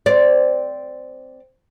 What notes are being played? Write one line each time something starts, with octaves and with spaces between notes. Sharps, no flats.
C4 D5